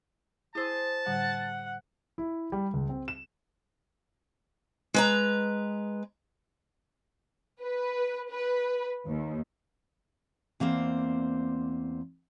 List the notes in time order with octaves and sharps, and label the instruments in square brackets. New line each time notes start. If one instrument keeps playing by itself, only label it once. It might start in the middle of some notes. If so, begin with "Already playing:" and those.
[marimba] E4 E6 [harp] G#4 C5 D#6 [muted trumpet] A5
[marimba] A2 D3 G3 [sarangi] F#5
[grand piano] E4
G3
C#2
C4
E7
[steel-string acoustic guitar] G#3 B4 A#5
[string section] B4
B4
D#2
[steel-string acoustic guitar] E2 A#3 C4 C5 D5